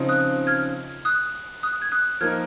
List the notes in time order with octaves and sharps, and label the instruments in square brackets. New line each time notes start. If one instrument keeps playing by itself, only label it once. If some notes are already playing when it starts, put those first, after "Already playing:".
Already playing: [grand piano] C#3 F3 C4 D#4
[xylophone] D#6 F#6
F6 G#6
D#6 F#6
D#6 F#6
G#6
D#6 F#6
[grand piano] F3 A#3 D#4 A#4 [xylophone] F6 G#6